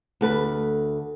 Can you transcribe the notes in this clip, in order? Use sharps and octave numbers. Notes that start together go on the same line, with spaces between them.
D2 A4 B4